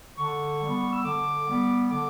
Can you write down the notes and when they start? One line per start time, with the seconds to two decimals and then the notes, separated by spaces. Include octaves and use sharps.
0.18 D3 C#6
0.62 G3 B3
0.93 E6
1.04 D3 D6
1.47 G3 B3
1.90 D3 D6